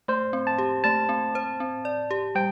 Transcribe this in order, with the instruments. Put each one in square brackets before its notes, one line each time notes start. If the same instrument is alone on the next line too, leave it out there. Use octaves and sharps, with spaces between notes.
[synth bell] A3 [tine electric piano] C5
[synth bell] C4
[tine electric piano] A5
[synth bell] G4
[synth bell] A3 [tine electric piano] A5
[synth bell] C4
C5
C4
D5
G4
[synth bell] G3 [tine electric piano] G5